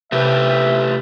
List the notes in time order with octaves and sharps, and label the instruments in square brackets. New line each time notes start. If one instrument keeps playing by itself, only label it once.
[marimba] C3 [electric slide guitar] A3 G4 B4 [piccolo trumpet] E5